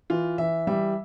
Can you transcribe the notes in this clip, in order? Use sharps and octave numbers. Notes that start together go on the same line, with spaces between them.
E3 F4
E3 E5
G3 E5